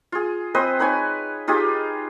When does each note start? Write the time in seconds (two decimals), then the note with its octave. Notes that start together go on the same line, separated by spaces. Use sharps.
0.12 F4 G#4
0.55 C4 B4 C5 D#5
0.79 D#4 B4 C#5 G#5
1.47 D#4 F4 G4 G#4